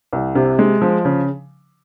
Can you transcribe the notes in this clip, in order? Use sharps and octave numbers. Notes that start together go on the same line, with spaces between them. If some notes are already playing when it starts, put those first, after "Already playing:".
C2
C3
G#3
F3
C#3